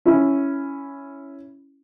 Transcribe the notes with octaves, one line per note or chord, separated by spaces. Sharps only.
C#4 E4